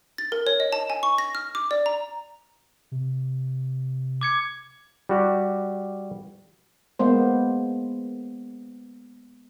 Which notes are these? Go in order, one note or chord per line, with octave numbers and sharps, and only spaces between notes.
A6
A#4
C#5
D#5
A5
G#5
C#6
A#6
F6
D6
D5
A#5
C3
D6 G#6 C#7
G3 F#4 G4
G#3 A#3 B3 C5